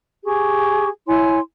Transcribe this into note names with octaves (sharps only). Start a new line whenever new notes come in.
G4 G#4 C#6
E4 C#5 G#5 C6